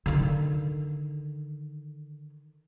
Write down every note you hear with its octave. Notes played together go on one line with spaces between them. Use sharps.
D3 D#3